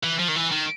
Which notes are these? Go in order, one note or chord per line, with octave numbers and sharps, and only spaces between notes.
E3
F3
D#3
E3
D#3